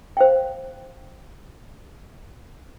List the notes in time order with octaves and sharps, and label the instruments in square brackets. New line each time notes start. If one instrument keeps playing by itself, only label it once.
[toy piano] C5 F5 G5